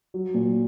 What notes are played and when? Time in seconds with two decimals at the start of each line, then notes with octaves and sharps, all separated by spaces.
0.14 F#3
0.34 A#2